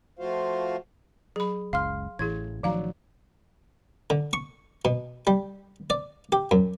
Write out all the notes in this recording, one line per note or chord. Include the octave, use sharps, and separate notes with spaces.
F3 A3 F4 F#4 C5 F5
F#3 G#4 B5
F#1 C#2 F5 C6 F6
A1 A2 E3 E4 G#4 G#6
A1 D#3 F3 F#3 F5 A#5
D3
C#6
B2
G3
D5
G4
F#2